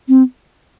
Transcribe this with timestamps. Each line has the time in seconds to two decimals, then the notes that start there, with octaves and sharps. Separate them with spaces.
0.08 C4